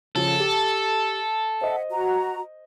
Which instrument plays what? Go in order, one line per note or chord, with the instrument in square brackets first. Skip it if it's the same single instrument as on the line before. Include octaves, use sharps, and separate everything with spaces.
[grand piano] C#3 F3 [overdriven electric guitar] A4
[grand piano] G4
[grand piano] C5 D#5 [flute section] E5 F#5
[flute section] F#4 A#5